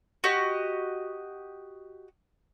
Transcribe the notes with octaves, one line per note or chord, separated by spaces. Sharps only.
F#4 G4 D#5